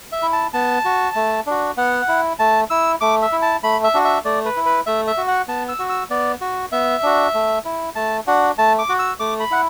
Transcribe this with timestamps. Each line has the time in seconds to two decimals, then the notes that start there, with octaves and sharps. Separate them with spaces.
0.12 E5
0.22 E4
0.33 A5
0.53 B3 A5
0.85 F#4
1.16 A3
1.46 D4 F#4
1.77 B3 F#5
2.08 E4
2.39 A3 A5
2.70 E4 E6
3.01 A3 D6
3.22 E5
3.32 E4
3.42 A5
3.63 A3 B5
3.84 E5
3.94 D4 F#4
4.05 E5
4.24 A3 D5
4.45 B4
4.56 E4
4.66 B4
4.86 A3 E5
5.07 E5
5.17 F#4
5.28 F#5
5.48 B3 A5
5.69 E6
5.79 F#4
5.89 E6
6.10 B3 D5
6.41 F#4
6.72 B3 E5
7.03 D4 F#4
7.34 A3
7.65 E4
7.96 A3 A5
8.27 D4 F#4 F#5
8.58 A3 A5
8.79 D6
8.89 F#4
8.99 E6
9.20 A3 D6
9.40 B5
9.51 E4 F#5